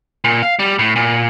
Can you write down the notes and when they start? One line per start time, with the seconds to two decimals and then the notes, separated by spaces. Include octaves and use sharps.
0.24 A#2
0.42 F5
0.59 G3
0.79 A2
0.96 A#2